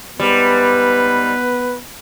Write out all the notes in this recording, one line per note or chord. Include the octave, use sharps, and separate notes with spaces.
G#2 G3 B3 B4